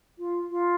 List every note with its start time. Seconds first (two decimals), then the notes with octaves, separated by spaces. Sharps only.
0.19 F4
0.50 F4